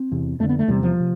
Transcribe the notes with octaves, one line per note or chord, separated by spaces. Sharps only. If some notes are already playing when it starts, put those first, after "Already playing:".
Already playing: C4
E2 C3
F2 D3 A3
B3
A3
E2 C3 G3
F3
C3